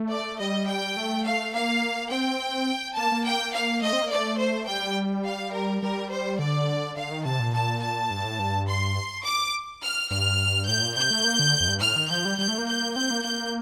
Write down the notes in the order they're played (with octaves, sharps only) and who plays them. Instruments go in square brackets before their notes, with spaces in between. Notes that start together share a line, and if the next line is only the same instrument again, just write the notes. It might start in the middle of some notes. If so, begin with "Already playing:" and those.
Already playing: [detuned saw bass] A3
[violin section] D5
[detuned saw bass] G3 [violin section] D#5
[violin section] G5
[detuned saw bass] A3
[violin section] F5
[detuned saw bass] A#3 [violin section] F5
[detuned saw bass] C4 [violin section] G5
[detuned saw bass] A#3 [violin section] A5
[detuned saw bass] A#3
[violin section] G5
F5
[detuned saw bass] A3 [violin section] D#5
[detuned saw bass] C4
A#3
[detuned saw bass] A3 [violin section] D5
[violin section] C5
[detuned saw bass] G3 [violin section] G5
[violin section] F5
A#4
[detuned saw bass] G3 [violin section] A#4
[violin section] C5
[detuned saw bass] D3 [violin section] D5
[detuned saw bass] D3 [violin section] F5
[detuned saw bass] D#3
[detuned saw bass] C3 [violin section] A5
[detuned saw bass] A#2
[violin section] A5
A5
[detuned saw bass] G2
A2
G2
[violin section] C6
D6
F6
[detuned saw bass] G2 [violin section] F6
[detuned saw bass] A2 [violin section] G6
[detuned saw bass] A#2
[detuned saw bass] C3 [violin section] G6
[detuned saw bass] A3
A#3
D3
F2
G2
[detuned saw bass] A2 [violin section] F6
[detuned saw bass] D#3
[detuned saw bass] F3 [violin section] G6
[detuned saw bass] G3
[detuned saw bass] G3 [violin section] G6
[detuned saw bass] A3
A#3
[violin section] G6
[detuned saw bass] C4 [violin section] G6
[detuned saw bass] A#3
[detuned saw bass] A#3 [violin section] G6